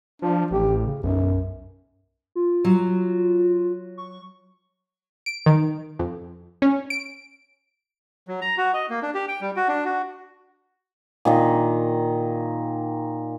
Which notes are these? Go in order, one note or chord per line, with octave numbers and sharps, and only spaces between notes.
F3 D4
A1 G4
C#3
B1 F#2
F4
F#3
C#6
D7
D#3
F2
C#4
D7
F#3
A#5
F#4
D#5
A#3
D4
G4
G5
G3
F#4
D4
F#4
A#2 D#3 D#5